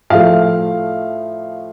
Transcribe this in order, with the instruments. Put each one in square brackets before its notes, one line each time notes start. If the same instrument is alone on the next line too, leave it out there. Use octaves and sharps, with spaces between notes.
[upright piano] A2 F3 A3 F5